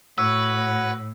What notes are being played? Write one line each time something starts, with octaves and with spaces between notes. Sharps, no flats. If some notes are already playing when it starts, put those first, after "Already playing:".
A2 F#4 B4 C#5 F#5 E6